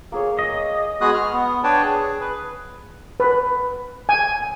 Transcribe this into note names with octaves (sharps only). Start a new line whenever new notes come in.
A#3 G#4 C#5
D#5
G#3 B3 F#4 G#4 D#6 F#6
F6
B3
D4 B4 C#5 G5 A5
G#4
B4
B4
G#5